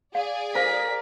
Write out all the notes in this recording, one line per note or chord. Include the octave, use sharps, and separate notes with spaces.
G#4 D5 F5
A#4 C5 F5 B6